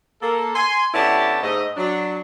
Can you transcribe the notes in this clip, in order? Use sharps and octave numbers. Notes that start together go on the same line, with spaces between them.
A#3 A4
G#5 C6
D3 B3 C#4 E4 G4 A5
G#2 A3 D#5
F#3 D4